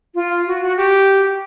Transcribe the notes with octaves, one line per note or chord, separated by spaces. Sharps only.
F4
F#4
F#4
G4